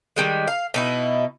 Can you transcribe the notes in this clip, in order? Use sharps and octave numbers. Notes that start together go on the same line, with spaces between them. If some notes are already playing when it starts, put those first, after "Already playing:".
D#3 G3 G#3
F5
B2 D#4 E4